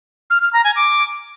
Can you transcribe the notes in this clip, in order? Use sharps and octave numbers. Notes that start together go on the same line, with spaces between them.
F6
F6
A#5
G#5
D6